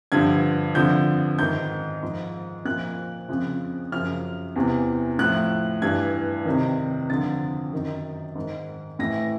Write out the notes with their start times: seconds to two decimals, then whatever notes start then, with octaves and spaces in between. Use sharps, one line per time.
0.12 G2 D3 F3 G#6
0.75 F2 D3 F3 G6
1.39 G#2 D#3 G6
2.03 G#2 F3
2.65 A#2 F3 F#6
3.28 F2 C#3 F3
3.92 F#2 C#3 F3 F6
4.56 E2 C3 E3
5.19 A2 F3 F#6
5.82 G2 E3 G#6
6.45 F2 C3 D#3
7.09 F2 D3 F3 A6
7.72 F#2 D#3
8.35 G#2 D#3
8.99 A2 E3 A#6